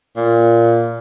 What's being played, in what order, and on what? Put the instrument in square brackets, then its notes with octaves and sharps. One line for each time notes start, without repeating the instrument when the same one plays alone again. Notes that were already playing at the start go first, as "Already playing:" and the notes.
[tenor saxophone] A#2